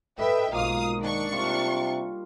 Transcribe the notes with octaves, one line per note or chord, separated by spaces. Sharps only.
A4 B4 D#5 E5 G5
B1 G#2 A#3 F4 F5 D#6
D#3 D4 C#6
C3 G3 F4